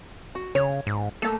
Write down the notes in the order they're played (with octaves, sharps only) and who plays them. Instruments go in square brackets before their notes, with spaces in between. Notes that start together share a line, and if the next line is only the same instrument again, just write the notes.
[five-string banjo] F#4
[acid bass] C#3 [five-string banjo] C#5
[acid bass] G#2
[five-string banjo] A3 A#3 [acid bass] A4